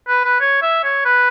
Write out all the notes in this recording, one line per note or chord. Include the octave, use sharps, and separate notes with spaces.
B4
B4
C#5
E5
C#5
B4